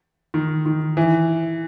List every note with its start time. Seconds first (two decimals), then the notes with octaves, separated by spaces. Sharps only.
0.34 D#3
0.66 D#3
0.97 E3